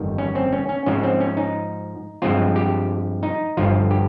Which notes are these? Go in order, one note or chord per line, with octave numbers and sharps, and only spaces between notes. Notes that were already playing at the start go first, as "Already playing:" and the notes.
Already playing: G1 F2 D#3 G3
C#4
C4
C#4
C#4
G#2 F3 G#3 C4 C#4
C4
C#4
D#4
G2 F3 G#3 C4 F4
G4
D#4
G1 G2 F3 F4
G4